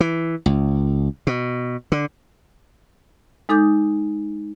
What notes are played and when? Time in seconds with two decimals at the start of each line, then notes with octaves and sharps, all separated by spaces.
0.01 E3
0.46 C#2
1.27 B2
1.92 D3
3.49 G#3 D#4 A4 D6 D#6 G6